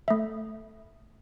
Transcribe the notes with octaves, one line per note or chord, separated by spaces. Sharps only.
A3 E5